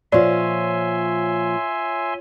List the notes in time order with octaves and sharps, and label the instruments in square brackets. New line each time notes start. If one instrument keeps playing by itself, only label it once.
[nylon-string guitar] A#2 F3 [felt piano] F4 C#5 [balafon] D5 [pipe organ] E5 G#5 C6